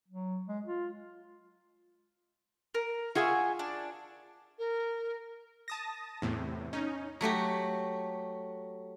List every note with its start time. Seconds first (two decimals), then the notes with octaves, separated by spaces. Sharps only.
0.08 F#3
0.48 G#3
0.66 F4
2.74 A#4
3.15 F4 G#4 E5 F#5 G#5 C#6
3.59 D4
4.59 A#4
5.68 A5 D#6 A#6
6.22 E2 A2 C3
6.73 C#4 D#4
7.21 F#3 A3 F#4 G4